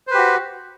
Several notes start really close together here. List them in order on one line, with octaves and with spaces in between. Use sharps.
C5 B4 G4 F#4